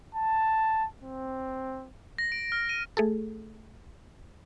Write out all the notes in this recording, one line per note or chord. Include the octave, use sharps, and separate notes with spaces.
A5
C4
A#6
D7
F6
D#7
A3 G#4 A4